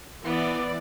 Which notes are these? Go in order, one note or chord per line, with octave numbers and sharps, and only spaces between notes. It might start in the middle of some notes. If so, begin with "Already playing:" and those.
E3 B3 D5